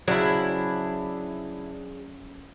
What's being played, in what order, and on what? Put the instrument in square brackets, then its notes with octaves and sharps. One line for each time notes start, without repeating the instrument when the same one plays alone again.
[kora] C#3 F#3 [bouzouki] D4 E4 [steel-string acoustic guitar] G#4 C5